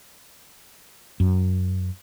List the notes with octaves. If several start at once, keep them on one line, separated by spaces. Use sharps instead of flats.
F#2